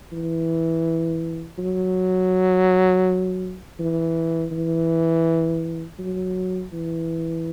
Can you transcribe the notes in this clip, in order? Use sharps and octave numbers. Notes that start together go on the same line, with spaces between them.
E3
F#3
E3
E3
F#3
E3